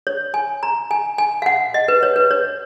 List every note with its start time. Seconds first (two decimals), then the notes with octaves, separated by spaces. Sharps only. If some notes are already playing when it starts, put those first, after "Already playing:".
0.07 C#5
0.34 G#5
0.63 A#5
0.91 G#5
1.18 G#5
1.42 F5
1.46 F#5
1.74 D#5
1.88 B4
2.03 C#5
2.16 B4
2.31 C#5